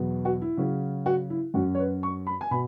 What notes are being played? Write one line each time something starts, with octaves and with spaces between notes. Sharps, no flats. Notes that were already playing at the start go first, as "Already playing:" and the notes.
Already playing: E2 B2 F#3 B3
F#4
E4
C#3 F#3 C#4
F#4
E4
F#2 F#3 C#4 F#4
C#5
B4
C#6
B5
G#5
B2 B5